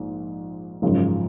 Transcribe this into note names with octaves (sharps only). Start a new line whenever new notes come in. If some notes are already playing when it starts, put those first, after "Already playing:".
Already playing: A#1 G#2
G#1 F#2 C#3 F3